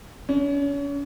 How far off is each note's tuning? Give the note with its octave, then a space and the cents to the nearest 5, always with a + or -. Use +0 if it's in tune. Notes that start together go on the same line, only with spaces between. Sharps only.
C#4 +35